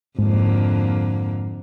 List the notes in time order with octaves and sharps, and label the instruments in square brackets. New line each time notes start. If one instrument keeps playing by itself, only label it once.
[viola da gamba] F2 D3 A#3 [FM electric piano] G#2